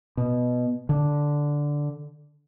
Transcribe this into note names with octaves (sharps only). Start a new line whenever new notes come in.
B2
D3